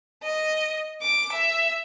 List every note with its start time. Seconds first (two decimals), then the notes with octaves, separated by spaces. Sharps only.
0.23 D#5
1.02 D6
1.32 E5